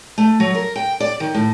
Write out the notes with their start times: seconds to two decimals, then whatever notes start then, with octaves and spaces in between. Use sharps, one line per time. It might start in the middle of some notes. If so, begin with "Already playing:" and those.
0.18 A3
0.40 F#3
0.55 A#4
0.76 G5
1.00 D5
1.20 D#3
1.34 A2